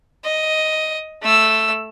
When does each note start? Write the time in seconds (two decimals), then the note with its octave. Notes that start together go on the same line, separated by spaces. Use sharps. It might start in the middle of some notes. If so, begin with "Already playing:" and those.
0.24 D#5
1.22 A3 E6